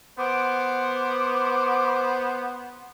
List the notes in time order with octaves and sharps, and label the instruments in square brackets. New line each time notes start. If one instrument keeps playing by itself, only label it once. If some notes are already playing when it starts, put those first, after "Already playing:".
[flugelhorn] B3 [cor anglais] C5 [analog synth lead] D6